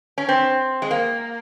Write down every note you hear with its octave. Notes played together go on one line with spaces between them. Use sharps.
C#4
C4
G#3
A#3